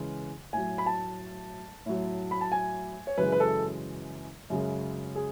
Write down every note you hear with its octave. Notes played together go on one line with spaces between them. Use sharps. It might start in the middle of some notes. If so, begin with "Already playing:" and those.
Already playing: C#3 E3 G#3
A2 F#3 G#5
B5
A5
A2 F#3
B5
A5
G#5
C#5
F#2 C#3 E3 G#3 B4
B4
A4
F#2 C#3 G#3
G#4